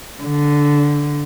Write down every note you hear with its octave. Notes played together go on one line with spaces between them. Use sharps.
D3